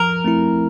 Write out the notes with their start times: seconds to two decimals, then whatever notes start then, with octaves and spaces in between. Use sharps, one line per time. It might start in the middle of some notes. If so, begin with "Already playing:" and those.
Already playing: F3 A#4
0.24 A3 C4 E4